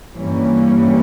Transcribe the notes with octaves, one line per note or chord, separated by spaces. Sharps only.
G2 E3 G3 A#3 C#4